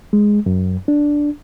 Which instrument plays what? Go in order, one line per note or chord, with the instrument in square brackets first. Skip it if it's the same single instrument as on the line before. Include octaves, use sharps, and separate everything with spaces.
[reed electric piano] G#3
F#2
D4